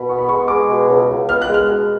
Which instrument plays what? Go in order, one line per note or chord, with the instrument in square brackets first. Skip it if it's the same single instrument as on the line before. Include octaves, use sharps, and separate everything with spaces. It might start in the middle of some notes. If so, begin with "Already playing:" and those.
Already playing: [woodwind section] B2 [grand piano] B5
[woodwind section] B3 [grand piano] C#6
[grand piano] B5
[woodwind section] G#3 [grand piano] C#6
[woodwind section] G#3 [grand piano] D6
[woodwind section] B2
C#2
C#2
[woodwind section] B3 [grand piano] F6
[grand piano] F#6
[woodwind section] G#3
[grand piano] F6
[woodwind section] B2